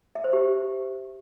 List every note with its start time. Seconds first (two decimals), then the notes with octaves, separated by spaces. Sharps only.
0.15 E5
0.24 C5
0.33 G4